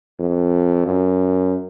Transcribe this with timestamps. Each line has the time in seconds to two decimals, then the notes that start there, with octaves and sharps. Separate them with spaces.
0.19 F2
0.87 F#2